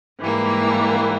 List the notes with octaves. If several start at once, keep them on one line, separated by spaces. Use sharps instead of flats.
G#2 E3 G3 A#3